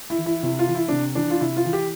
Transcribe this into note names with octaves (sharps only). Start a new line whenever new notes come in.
E4
E3
E4
C3 E4
F4
E3
E4
C3 D4
E3 D4
F4
C3 E4
F4
E3
G4